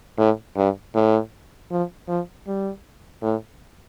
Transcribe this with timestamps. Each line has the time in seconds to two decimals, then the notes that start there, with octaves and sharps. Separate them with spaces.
0.18 A2
0.56 G2
0.95 A2
1.71 F3
2.08 F3
2.47 G3
3.22 A2